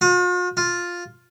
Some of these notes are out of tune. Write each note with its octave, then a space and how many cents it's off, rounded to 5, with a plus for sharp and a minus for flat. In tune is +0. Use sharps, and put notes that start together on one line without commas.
F4 +45
F4 +5